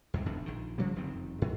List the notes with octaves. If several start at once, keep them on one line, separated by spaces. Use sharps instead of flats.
E2 G#2 C3
E1 E2 C3 D4
A#1 D#3
C#3 F3 G3 A#3
F1 F#2 D#3 C4
G#2